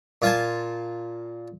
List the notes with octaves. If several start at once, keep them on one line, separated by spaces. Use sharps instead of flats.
A#2 F4 F5 G#5 A5